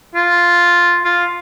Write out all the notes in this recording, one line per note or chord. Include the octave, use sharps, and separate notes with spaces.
F4
F4